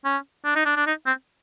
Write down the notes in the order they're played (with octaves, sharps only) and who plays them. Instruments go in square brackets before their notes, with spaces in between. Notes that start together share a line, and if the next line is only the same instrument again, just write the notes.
[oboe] C#4
D4
D#4
D4
D4
D#4
C4